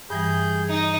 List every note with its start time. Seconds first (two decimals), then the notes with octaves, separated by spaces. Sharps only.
0.10 G2 E3 G3 G#4 G6
0.69 D#4 D#5